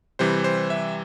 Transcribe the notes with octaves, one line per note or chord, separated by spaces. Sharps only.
C3 E3 G3 C5
C5
E5